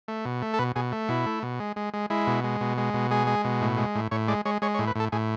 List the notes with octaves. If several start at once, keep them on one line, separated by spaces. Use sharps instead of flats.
A3
B2
A3
A4
B2 B4
B2 G#4
A3
B2 E4
A3
B2
G#3
G#3
G#3
G#3 E4
B2
G#3
B2
G#3
B2
G#3 G#4
G#3
B2
A2
G#3
A2
A2 C#5
G#3 D5
G#3 C#5
G#3 C#5
C#5
A2
B4
A2 A4
A2 G#4